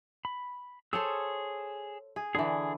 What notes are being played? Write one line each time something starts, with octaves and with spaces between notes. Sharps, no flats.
B5
G#4 A4 C5 C#5 E6
G#4
D3 E3 G#4 D5